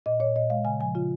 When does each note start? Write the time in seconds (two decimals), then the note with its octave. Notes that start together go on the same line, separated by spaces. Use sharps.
0.06 A#2 D#5
0.20 A#2 C#5
0.36 A#2 D#5
0.50 G#3 F5
0.65 C#3 G#5
0.80 F3 G#5
0.95 C#3 F4